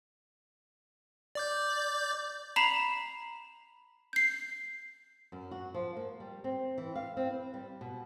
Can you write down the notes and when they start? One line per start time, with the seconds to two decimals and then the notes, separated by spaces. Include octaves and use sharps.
1.35 D5 D6 G6
2.56 A#5 B5 B6 C7 E7 F7
4.13 G6 C7
5.32 F#2
5.51 F#4
5.74 F3
5.97 A#3
6.20 G3
6.44 C4
6.78 E3
6.95 F5
7.17 C4
7.30 B4
7.54 G3
7.81 B2